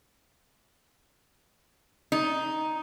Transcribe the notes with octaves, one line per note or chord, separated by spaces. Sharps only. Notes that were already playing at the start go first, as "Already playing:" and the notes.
D#4